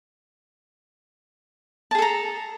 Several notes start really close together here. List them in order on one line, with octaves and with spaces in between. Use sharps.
A5 G#4 A4 A#5